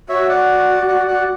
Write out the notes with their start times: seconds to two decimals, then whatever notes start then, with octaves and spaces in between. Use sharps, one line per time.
0.09 F#4 C#5 E5
0.29 D5 F#5
0.87 D5 F#5
1.07 D5 F#5